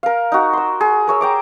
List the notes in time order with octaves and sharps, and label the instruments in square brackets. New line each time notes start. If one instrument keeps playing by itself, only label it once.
[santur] A#4 F5
D#4 F#4
C6 E6
G#4
A#4 C#5 E6
G5 A#5 D6